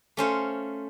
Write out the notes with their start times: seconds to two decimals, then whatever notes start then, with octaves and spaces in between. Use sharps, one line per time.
0.17 A3 C#4 C5 F5